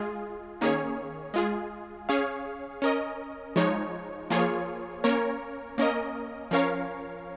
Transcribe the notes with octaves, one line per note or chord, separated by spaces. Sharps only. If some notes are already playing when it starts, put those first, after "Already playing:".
Already playing: G#3 F4 G#4
D#3 A#3 C#4 G#4 C#5
G#3 F4 G#4
C#4 G#4 C#5 F5
C#4 A#4 D#5
F3 G#3 D#4 C#5
F3 A#3 F4 G#4 C#5
A#3 C#4 A#4 C#5
A#3 C#4 A#4 D#5
F3 C#4 A#4 C#5 F5